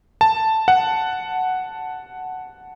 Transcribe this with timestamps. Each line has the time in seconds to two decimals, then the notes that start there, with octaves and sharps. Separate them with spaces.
0.21 A5
0.68 F#5